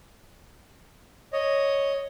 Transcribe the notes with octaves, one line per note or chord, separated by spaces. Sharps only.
C#5 D#5